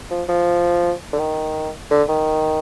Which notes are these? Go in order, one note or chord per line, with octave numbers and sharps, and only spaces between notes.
F3
F3
D3
D#3
D3
D#3